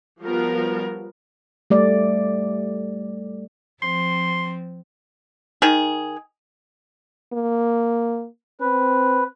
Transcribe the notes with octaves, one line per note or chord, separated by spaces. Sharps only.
F3 G3 B3 F4 F#4 A#4
G3 A3 D5
F3 C4 C6
D#3 G#4
A#3
C4 B4